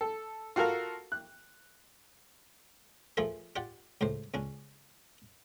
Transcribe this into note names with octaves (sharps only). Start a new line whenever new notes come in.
A4
F4 F#4 A4 A#4 F5
F#6
F3 A3 E4 F4 G#4 A#4
F4 G4 D5 F#5
C#2 A2 A3 C5
C#2 C#4 D4